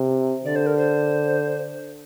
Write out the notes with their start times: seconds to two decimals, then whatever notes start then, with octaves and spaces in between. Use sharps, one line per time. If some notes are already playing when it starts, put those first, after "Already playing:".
Already playing: C3
0.45 D3 D5
0.56 C5
0.66 A#4
0.77 C5